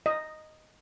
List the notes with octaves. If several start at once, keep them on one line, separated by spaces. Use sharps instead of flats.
D#5